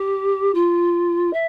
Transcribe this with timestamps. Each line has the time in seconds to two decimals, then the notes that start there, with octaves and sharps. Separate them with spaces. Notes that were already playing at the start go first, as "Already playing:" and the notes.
Already playing: G4
0.54 F4
1.33 E5